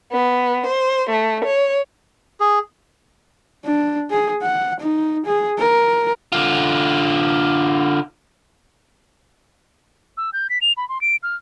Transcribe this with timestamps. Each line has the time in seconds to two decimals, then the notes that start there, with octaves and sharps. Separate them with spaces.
0.11 B3
0.66 C5
1.10 A3
1.45 C#5
2.40 G#4
3.65 D4
4.11 G#4
4.43 F#5
4.80 D#4
5.26 G#4
5.59 A#4
6.32 D3 F4
10.17 E6
10.33 G6
10.50 B6
10.62 F7
10.77 B5
10.89 C6
11.01 D7
11.23 F6